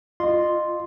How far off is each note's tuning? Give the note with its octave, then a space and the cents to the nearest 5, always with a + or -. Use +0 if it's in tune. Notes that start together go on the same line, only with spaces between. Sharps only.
F4 +0 D#5 -30 C6 +0